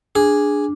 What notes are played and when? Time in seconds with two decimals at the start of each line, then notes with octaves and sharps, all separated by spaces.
0.15 D4 G#4